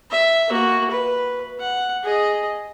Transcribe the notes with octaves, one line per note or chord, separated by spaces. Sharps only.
E5
A#3 F#4
B4
F#5
G#4 D#5